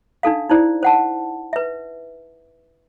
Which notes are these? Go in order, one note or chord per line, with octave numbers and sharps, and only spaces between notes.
D4 D#4 A4 F5
D#4 E4 C5 D5
C5 F#5 A5
B4 E5